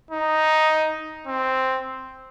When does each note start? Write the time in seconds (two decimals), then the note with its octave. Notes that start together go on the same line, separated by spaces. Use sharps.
0.11 D#4
1.27 C4